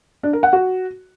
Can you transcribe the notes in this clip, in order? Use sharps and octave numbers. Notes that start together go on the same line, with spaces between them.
D4
A#4
F#5
F#4